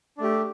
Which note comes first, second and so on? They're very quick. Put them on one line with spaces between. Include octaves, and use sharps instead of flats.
D4 A3 G4